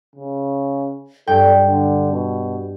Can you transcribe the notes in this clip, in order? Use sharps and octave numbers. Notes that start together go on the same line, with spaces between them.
C#3
G2 A4 G5
D3
B2